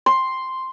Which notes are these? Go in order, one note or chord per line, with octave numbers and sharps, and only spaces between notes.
C6